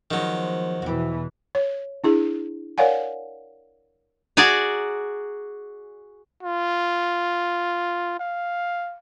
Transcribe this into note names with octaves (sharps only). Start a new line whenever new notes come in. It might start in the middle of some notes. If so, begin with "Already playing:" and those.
D#3 F3 F#3 G#3 B3
E2 B2 E3 F#4 G4
C#5
D4 E4 G#4
A#4 C#5 D5 F5 F#5 G#5
F#4 G#4 D5 G#5 A#5
F4
F5